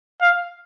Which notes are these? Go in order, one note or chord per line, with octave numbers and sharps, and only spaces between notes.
F5